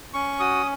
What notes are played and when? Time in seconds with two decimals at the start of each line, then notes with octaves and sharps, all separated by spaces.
0.14 C#4 C#6
0.40 F#4 D#6